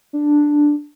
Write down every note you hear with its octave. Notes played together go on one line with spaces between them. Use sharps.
D4